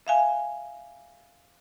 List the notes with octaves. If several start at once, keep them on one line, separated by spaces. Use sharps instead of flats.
E5 F5 G#5